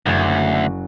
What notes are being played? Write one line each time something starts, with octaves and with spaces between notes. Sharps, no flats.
F#1 D2 F#4 C#5